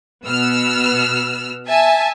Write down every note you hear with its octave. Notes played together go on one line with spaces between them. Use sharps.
B2 B3 E6 F6
E5 G#5 A5